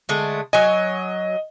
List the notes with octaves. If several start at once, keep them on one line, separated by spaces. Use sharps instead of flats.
D3 G#3 A3
F#3 D#5 G#5